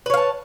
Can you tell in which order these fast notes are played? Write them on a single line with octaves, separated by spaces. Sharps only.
B4 C#5 F5 A5